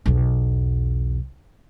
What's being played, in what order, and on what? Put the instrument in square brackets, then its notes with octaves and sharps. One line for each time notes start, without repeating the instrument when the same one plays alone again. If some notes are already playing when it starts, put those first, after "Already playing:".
[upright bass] B1 E2